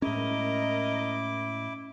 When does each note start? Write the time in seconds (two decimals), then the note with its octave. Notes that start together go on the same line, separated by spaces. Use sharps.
0.02 A2 G#3 C#4 E4 A#4 D#5 D6